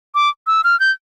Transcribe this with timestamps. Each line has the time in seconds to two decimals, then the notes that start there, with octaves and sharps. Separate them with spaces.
0.15 D6
0.47 E6
0.64 F6
0.80 G6